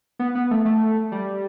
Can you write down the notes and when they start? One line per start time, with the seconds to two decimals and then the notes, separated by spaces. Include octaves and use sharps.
0.19 B3
0.35 B3
0.51 A3
0.65 A3
1.12 G3